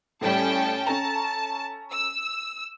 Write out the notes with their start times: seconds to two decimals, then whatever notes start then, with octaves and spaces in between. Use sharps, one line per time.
0.21 A2 G3 C#4 G5 A5
0.87 C#4 A4 A5 A#5
1.91 E6